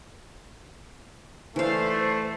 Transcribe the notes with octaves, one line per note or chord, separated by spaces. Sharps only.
E3 A3 C5 D5 F5